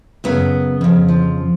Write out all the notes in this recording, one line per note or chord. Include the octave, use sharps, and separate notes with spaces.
F#2 C#3 B3
F2 C#3
F3